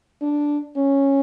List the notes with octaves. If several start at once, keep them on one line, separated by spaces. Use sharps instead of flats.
D4
C#4